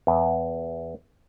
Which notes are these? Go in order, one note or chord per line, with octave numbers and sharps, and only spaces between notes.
E2